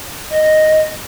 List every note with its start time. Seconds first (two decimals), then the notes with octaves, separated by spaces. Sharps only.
0.30 D#5